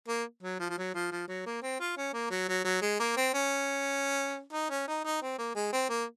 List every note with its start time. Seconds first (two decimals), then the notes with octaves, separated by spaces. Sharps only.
0.08 A#3
0.43 F#3
0.60 F3
0.70 F3
0.78 F#3
0.94 F3
1.12 F3
1.28 F#3
1.46 A#3
1.62 C4
1.80 F4
1.97 C#4
2.13 A#3
2.30 F#3
2.48 F#3
2.65 F#3
2.82 G#3
3.00 A#3
3.17 C4
3.34 C#4
4.53 D#4
4.70 C#4
4.88 D#4
5.05 D#4
5.22 C4
5.38 A#3
5.55 G#3
5.73 C4
5.89 A#3